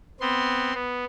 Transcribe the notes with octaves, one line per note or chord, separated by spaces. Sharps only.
B3 C4 C6
B3